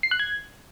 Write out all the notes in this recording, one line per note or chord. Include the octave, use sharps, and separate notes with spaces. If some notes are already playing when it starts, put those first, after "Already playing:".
C7
F#6
G#6